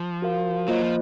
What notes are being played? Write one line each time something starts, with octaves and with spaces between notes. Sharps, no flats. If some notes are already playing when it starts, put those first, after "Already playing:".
Already playing: F3
F#4 A#4 F5
F#3 A#3 F4 C5 D#5
F3